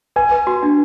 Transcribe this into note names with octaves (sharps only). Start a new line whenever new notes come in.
B4 G#5
B4
F#4
D4